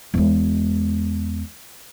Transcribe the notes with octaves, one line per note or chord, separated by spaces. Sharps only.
E2 G#3